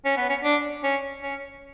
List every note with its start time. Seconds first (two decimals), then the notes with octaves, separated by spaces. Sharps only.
0.05 C#4
0.17 B3
0.29 C#4
0.44 D4
0.84 C#4
1.23 C#4